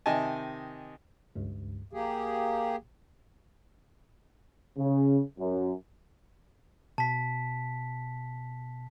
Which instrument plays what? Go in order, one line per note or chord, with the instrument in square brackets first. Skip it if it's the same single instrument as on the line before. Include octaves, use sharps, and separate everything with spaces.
[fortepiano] C3 D#3 D#5 G#5 A5
[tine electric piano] G#1 C#2 G2
[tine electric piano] A#1 [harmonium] A#3 G4 G#4
[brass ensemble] C#3
F#2
[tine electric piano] B2 [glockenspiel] A5 B6